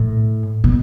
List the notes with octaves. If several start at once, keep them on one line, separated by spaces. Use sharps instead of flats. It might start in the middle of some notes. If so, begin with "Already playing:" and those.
Already playing: A2
B2